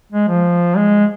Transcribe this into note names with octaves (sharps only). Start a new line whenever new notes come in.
G#3
F3
G#3